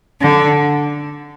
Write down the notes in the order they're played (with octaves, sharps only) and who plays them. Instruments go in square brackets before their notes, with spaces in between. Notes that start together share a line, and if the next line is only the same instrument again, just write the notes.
[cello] D3